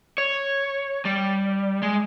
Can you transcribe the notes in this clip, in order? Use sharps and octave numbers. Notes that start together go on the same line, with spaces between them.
C#5
G3
G#3